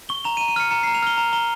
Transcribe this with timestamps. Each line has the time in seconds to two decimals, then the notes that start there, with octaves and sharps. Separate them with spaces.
0.09 C#6 G7
0.24 A#5 F7
0.37 D#7
0.41 A#5
0.48 D#7
0.56 F6 C#7
0.71 A#5 C#7
0.83 A#5 C7
0.95 F7
1.02 F6 G7
1.18 A#5 F7
1.33 A#5 G7